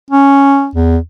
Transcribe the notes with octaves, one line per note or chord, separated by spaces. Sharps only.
C#4
E2